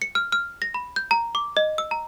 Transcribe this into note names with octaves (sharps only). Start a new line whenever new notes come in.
C#7
F6
F6
A#6
B5
G6
A#5
D6
D#5
E6
A#5